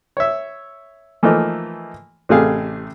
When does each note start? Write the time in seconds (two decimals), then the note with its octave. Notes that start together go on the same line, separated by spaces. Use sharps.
0.17 C#5 E5
1.23 E3 F3 A3 A#3 D#4
2.29 A1 C3 A3 G#4 F5